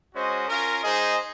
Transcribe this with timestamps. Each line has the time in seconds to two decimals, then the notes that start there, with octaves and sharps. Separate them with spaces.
0.13 G#3 C#4 F#4 C5 D#5
0.48 C#4 F4 A#4
0.83 G#3 D#4 G#4 C5 D#5